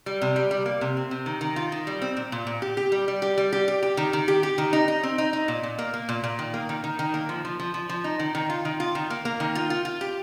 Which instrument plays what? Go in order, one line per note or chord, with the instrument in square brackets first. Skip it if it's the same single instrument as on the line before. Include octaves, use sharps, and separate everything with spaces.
[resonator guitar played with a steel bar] G3
C3
G3
G3
A#3
C3
C4
C3
D#3
D#3
F4
D#3
G3
C4
A#2
A#2
A#2
G4
G4
G3
G3
G4
G3
G4
G4
G4
D#3
D#3
G4
G4
D#3
D#4
D#4
C4
D#4
D#4
A#2
A#2
A#3
A#3
A#2
A#2
D#3
A#3
D#3
D#3
D#3
A#3
F3
F3
F3
F3
F3
D#4
D#3
D#3
F4
D#3
F4
D#3
A#3
A#3
D#3
F4
F4
F4
G4